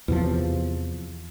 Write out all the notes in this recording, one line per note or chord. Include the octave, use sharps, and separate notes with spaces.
E2 C3 F3